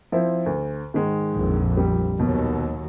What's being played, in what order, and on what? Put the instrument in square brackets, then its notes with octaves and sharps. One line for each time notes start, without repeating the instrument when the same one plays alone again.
[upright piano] F3 C4 E4
D2
G#2 D#3 G#3
[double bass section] A#1 F2
[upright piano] G3
[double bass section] D#2 F#3 [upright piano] B2